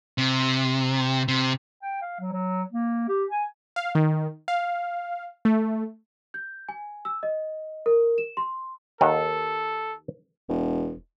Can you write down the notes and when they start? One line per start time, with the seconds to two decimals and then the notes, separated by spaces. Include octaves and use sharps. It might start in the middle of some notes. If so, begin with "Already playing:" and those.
0.18 C3
1.28 C3
1.82 G5
2.02 F5
2.20 F#3
2.33 F#3
2.72 A#3
3.08 G4
3.30 G#5
3.76 F5
3.95 D#3
4.48 F5
5.45 A3
6.34 G6
6.69 G#5
7.05 E6
7.23 D#5
7.86 A#4
8.18 E7
8.37 C6
9.01 D#2 D#3 A4 F#5
10.49 E1